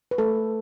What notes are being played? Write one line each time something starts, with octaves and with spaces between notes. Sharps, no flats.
B4
A3 A4